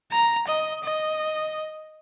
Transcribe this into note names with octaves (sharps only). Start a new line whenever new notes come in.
A#5
D#5
D#5